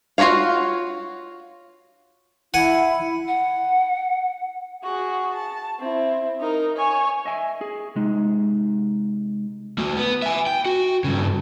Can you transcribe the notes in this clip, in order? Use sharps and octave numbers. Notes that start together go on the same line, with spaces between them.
F4 F#4 B4 C#5 F5
E4 F#5 G#5
F#5
F#4 G#4
A5
C4 E4
D#4 A#4
C#5 G#5
D#5 E5 G#5
G#4
C3 G#3 D#4
A3 F#4
B3
E5 G#5
G5
F#4
G2 C#3